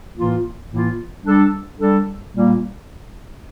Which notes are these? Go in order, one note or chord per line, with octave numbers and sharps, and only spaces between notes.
A2 E3 A#3 F4
A2 E3 A#3 F4
G3 D4 A4
G3 D4 A4
A#2 G3 A#3